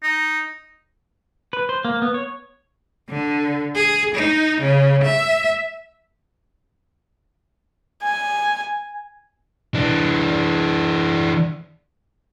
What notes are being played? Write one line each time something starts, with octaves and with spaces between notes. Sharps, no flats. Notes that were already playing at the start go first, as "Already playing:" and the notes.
D#4
B4
C5
A#3
B3
C#5
D3
G#4
D#4
C#3
E5
G#5
E3 D4